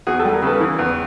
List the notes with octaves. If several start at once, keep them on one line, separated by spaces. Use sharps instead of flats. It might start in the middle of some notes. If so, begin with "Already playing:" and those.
E2 F#4 G#4
G4 A4
G3
G#4 A#4
C#3 A4 B4
E3
E2